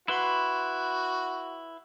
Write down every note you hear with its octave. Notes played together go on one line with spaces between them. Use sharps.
E4 F#4 B4 C6